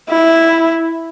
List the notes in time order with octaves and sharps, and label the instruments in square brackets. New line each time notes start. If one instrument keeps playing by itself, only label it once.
[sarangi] E4